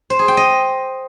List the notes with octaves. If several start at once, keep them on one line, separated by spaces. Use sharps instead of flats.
C5
G#4
G5
D#5